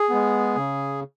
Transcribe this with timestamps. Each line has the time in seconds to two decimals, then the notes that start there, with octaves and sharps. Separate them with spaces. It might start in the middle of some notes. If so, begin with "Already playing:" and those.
Already playing: G#4
0.09 G#3 B3
0.56 C#3